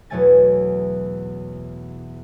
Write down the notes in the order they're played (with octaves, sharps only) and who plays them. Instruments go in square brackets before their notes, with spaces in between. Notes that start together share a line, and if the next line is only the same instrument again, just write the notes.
[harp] E2 B2 F#3 A3 G#5 A6